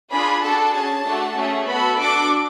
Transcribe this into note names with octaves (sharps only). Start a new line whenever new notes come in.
D4 F4 G#4 B5
D4 F#4 A4 A5
C#4 G#4
A3 D4 F#4 A4
A3 C#4 G#4
B3 F#4 A4 B5
D4 F#4 A4 D6